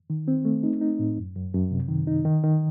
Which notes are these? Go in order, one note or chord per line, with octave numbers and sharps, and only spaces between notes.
D#3
C4
A3
D#4
D#4
A2
F#2
F#2
F#2
C3
D#3
D#4
D#3
D#3